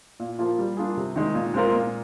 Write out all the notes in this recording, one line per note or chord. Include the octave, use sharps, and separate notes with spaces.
A#2
F3 A#3 F4
G3
A#3 D4 F4 G#4
C3
D#3 G#3 D#4
A#2
G#3 C4 F4 A#4
A#2